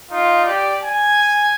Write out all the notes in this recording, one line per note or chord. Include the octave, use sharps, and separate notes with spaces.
D#4 F4
G4 D5
G#5